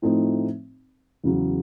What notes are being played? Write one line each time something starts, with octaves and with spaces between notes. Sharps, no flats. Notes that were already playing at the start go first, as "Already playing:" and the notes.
A2 F3 A3 C4 D#4
E2 C#3 F#3